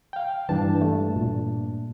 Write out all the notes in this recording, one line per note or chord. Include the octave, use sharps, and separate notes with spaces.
F5 G5
G2 E3 D4 A5
A3
A#2